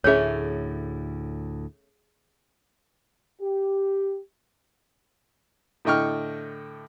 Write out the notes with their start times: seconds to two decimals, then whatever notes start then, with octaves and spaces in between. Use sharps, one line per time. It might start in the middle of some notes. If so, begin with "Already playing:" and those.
0.04 D2 A2 A3 C#4 G#4 C#5 E5
3.41 G4
5.85 A2 D3 D#5 G5 C#6 F6